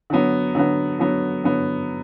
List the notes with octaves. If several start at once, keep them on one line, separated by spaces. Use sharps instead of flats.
D3 F#3 B3
D3 F#3 B3
D3 F#3 B3
D3 F#3 B3